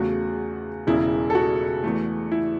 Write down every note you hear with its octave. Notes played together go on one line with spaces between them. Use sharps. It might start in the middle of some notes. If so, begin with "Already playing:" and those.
Already playing: E2 C#3 A3 F#4
E1 E2 C#3 E4
A4
F#4
E2 E3 A3
E4